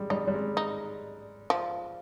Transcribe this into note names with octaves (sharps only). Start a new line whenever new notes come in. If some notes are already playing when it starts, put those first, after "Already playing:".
Already playing: G3 G#3
G3 D#4
G3
G#3
D#4
F3